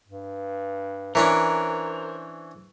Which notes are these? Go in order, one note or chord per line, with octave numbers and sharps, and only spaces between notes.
G2
E3 C#4 D4 A#4 C5